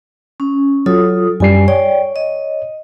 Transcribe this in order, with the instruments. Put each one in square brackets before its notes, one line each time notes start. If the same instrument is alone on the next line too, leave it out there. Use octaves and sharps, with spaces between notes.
[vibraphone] C#4
[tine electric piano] F#3 [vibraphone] F4 A4 D#6
[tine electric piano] F#2 G3 C7 [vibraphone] G#5
[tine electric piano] C#5 [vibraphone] D5 G5
[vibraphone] D#5